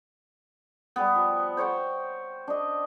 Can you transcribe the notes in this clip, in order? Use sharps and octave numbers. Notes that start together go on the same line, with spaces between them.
G3 B3
F3
C5 C#5 F#5 G5
D4 D#5